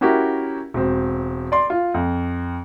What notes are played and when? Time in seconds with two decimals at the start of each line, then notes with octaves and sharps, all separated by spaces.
0.01 C#4 E4 F#4 G4 A#4
0.74 E1 C4
1.52 D5 C6
1.70 F4
1.94 F2